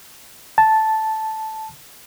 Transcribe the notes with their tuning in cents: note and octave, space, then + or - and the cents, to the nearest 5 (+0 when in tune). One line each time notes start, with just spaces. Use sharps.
A5 -5